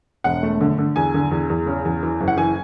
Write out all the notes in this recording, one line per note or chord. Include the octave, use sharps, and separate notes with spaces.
E1 F#5
A3
D3
D3
E2 G#5
D3
E2
E2
C#3
E2
E3
F#1
F#5
E3 G#5